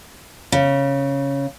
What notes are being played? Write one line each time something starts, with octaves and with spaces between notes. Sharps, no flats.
C#3